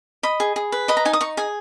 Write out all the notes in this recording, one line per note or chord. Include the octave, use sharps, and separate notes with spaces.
D#5 B5
G#4
G#4
B4
D#5 B5
A#5
D#4 G#5
D#6
D#4 C#6
G#4 G#5